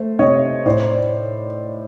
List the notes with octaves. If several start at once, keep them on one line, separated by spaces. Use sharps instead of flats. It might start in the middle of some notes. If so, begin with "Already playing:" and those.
Already playing: A3 C5
C3 C#5 D#5
A2 C5 D5